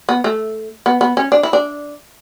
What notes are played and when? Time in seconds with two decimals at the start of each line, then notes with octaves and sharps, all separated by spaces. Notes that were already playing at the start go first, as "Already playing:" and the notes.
0.09 B3
0.24 A3
0.86 B3
1.01 B3
1.17 C#4
1.32 D4
1.43 E4
1.53 D4